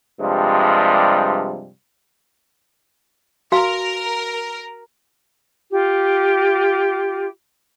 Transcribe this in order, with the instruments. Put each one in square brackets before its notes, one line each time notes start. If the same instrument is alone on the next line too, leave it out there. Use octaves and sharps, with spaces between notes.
[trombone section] G2 C3 F3 G3 G#3
[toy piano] F#4 F5 [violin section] A#4
[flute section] F4 G4